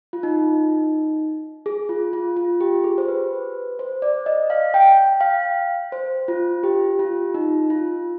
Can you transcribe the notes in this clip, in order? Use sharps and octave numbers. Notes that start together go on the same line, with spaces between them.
F4
D#4
G#4
F4
F4
F4
G4
G#4
C5
B4
C5
D5
D#5
F5
G5
G5
F5
C5
F4
G4
F4
D#4
F4